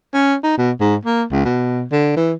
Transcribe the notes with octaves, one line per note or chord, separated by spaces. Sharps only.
C#4
D#4
B2
G#2
A#3
C#2
B2
D3
E3